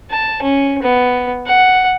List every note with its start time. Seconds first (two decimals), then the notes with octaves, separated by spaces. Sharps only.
0.11 A5
0.42 C#4
0.82 B3
1.46 F#5